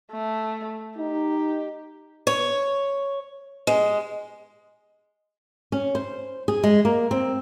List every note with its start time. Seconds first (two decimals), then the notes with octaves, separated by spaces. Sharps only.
0.11 A3
0.98 D#4 G4
2.27 C#5
3.67 G#3
5.72 C#4
5.95 C5
6.48 G#4
6.63 G#3
6.85 A#3
7.11 C4